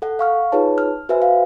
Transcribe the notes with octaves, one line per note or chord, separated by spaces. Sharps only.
A4 F#5
F5 C#6 F6
D#4 F4 G#4 B4 C#5 A5
F6
F#4 B4 C5 E5 G#5
F5